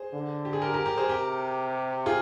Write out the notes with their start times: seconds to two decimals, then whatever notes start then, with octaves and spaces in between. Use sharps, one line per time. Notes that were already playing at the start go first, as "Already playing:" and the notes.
Already playing: G#4 C5
0.13 D3
0.45 G4
0.53 G#4
0.62 G4 A#4
0.74 G4 A#4
0.86 G4 A#4
0.97 G#4 C5
1.09 C3 G4 A#4
2.06 F4 G#4